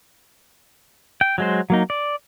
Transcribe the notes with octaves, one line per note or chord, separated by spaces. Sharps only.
G5
F#3 G#3 C5
F#3 A#3 D#4
D5